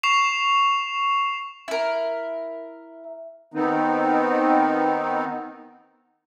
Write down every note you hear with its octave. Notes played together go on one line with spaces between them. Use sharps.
C#6 C7 E7 F7
E4 A#4
D#3 B3 C4 D#4